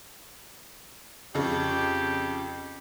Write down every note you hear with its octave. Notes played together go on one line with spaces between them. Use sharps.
F2 C#3 G4